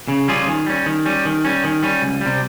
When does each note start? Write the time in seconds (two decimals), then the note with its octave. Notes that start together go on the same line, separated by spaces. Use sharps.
0.08 C#3
0.28 G3 C#4 F4 G#4
0.47 D#3
0.67 G3 C#4
0.86 D#3
1.06 G3 C#4
1.25 D#3
1.45 G3 C#4
1.64 D#3
1.83 G3 C#4
2.02 C#2
2.21 C3 G3